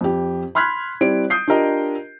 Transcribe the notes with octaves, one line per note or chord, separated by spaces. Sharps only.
F2 G4
B5 C6 F6 F#6 G#6 B6
G3 C4 E4 D5 D7
D#6 G6 C7
D4 F4 G4 A#4 D#5